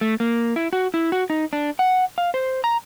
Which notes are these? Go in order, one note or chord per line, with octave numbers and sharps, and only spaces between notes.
A3
A#3
E4
F#4
E4
F#4
D#4
D4
F#5
F5
C5
A#5